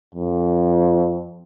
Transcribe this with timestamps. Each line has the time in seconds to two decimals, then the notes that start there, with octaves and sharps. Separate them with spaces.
0.15 F2